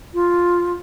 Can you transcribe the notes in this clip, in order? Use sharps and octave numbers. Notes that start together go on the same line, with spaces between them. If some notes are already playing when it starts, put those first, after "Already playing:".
F4